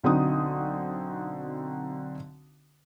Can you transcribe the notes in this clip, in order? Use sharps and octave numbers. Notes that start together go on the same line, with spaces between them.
B1 D3 C4 D#4 F#4 D#6